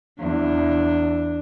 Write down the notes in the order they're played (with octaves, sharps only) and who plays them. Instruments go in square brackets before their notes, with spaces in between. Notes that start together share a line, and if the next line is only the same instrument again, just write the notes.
[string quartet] E2 [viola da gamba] D4